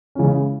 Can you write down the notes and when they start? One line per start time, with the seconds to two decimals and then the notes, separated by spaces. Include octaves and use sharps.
0.15 C#3 E3 G#3 C#4